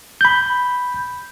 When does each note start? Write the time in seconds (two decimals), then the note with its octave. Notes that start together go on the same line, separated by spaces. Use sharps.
0.21 B5 G6